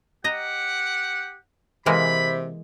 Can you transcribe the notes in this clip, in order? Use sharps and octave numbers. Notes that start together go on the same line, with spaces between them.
G4 D#5 F#5 A#5
C3 E3 G#3 A#3 B5